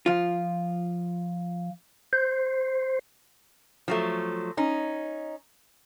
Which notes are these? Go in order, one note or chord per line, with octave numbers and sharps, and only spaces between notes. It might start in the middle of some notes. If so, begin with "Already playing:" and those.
F3 F4
C5
F3 F#3 A3
C#4 D#4